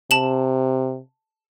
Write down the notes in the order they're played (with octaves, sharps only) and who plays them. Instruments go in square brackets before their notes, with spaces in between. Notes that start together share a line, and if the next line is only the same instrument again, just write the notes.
[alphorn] C3 [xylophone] A5 E7 F#7